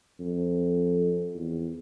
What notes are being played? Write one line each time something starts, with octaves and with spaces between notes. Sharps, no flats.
F2
E2